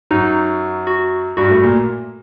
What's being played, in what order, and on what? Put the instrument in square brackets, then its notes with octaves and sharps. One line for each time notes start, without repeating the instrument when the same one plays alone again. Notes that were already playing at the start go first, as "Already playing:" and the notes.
[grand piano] F#2 F#3 [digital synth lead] D#4
[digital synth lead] F#4
[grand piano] G2 G3 [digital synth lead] F#4
[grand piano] A2 A3
A#2 A#3